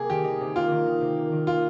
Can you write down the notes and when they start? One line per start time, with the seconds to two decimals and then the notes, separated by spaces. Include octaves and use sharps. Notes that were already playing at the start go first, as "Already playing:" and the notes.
Already playing: C3 A#3 G#4
0.09 D#3 G4
0.24 D#4
0.41 C3
0.56 A#3 F4
0.71 D#3
0.86 D#4
1.01 C3
1.17 A#3
1.32 D#3
1.47 A#3 F4